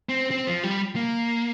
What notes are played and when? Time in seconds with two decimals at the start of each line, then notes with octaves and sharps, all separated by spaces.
0.09 C4
0.31 C4
0.47 F3
0.63 G3
0.96 A#3